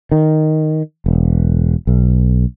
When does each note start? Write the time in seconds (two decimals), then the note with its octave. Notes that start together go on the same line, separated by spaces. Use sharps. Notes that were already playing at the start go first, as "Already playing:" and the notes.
0.12 D#3
1.06 E1
1.87 B1